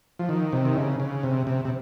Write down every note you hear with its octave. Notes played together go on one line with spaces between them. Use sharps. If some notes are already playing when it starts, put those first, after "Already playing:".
F3
D#3
C3
D#3
C#3
C#3
C3
C3
C3